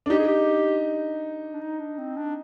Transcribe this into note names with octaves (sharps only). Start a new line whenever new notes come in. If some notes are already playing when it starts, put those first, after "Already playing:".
D4
D#4 G4
G#4
G4
D4
D#4
D4
C4
D4